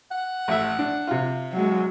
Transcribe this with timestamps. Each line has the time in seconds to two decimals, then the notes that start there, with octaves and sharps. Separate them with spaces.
0.11 F#5
0.48 A1 E5
0.79 D4
1.07 C3 F4
1.53 F#3 G#3